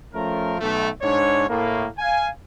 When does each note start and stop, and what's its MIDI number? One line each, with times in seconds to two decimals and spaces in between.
0.14 0.55 53
0.14 0.55 57
0.14 0.55 61
0.14 0.55 70
0.60 0.89 35
0.60 0.89 57
1.02 1.45 44
1.02 1.45 62
1.02 1.45 73
1.49 1.87 45
1.49 1.87 58
1.99 2.29 77
1.99 2.29 80